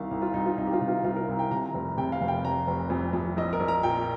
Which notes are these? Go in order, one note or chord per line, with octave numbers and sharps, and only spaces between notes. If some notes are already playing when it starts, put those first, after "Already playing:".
Already playing: C2 D#3 F5
C2
F4
C2 D#4
F4
C2 D#4
G4
F4
C3
F4
C2 F4
A#4
C2
G5
C3 A#5
A#5
F1
C3 G5
F5
F1
G5
F1 A#5
F1
F2
F2
A#1 D#5
A#4
A#1
A#5
A#2 G5